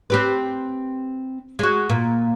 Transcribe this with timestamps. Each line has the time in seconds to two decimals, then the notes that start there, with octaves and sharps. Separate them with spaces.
0.10 C4 G4 B4
1.59 G#3 F#4
1.90 A#2